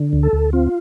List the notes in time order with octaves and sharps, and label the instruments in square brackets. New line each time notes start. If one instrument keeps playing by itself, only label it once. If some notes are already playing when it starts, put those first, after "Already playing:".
Already playing: [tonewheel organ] D3
D2
A4
D2
C4 F4